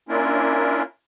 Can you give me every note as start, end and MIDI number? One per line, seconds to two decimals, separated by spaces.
0.09 0.83 58
0.09 0.83 61
0.09 0.83 62
0.09 0.83 64
0.09 0.83 65
0.09 0.83 70